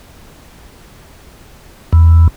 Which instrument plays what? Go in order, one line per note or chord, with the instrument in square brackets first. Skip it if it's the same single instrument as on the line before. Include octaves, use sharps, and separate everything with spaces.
[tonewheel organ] E2